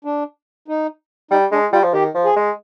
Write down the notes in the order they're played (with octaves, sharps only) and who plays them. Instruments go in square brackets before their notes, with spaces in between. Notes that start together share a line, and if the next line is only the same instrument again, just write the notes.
[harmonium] D4
D#4
[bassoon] G3 [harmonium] D#4
[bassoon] G#3 [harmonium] D4
[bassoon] G3 [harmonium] F4
[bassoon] F3
[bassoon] D#3 [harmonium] G4
[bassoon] F3
[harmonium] G#4
[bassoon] G#3